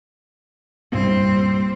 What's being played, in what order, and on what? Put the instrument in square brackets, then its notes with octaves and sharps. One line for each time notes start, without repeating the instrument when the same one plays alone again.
[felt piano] C2 G2 A#2 [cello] G3 C4